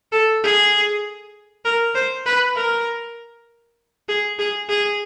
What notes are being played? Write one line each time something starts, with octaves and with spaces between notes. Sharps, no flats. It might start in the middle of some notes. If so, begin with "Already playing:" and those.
A4
G#4
A#4
C5
B4
A#4
G#4
G#4
G#4